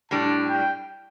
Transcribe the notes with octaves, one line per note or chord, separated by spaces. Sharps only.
A2 G3 D4 A5
G5